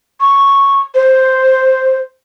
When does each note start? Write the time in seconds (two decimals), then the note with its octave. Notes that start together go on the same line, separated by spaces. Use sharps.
0.21 C#6
0.95 C5